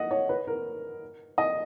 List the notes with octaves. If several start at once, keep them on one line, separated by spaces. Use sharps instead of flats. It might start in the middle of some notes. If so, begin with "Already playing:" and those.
Already playing: D#5 F#5
C#5
B4
A#4
D#5